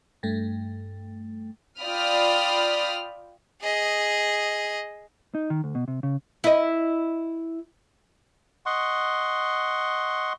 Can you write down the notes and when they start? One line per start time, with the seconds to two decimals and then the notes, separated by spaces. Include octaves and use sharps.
0.23 G2 A3
1.80 F4 D5 G5 B5 D#6 F6
3.62 G#4 D#5
5.35 D#4
5.50 D#3
5.64 D2
5.75 B2
5.88 C3
6.03 C#3
6.44 E4 D#5
8.66 D#5 F#5 C6 C#6